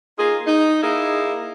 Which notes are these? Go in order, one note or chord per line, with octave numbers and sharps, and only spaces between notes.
A#3 D#4 F4 G#4
D#4
A#3 D#4 E4 G#4